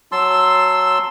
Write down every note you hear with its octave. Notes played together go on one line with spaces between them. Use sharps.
F#3 A5 C6 E6